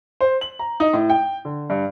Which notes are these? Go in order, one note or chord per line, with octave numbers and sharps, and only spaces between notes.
C5
F#7
A#5
D#4
A2
G5
D3
G2